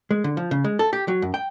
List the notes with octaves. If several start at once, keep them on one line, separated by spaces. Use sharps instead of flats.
G#3
D3
F3
C#3
G#3
A4
G4
F#3
F#2
G5